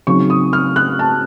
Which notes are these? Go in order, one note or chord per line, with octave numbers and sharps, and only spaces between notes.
C#3 F#3 C4 D#4 C#6
D#6
F6
F#6
A5